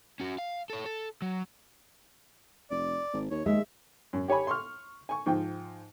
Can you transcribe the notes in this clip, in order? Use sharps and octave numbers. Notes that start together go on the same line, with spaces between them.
C#4 F#4
F5
A4 C#5
A4
F#3
F1 D5
G#1
D#2 C#5
D#2 G#3 E5
F#2
G4 C#5 G#5 B5
C6 C#6 F6
G#5 C#6
G#2 F3 G5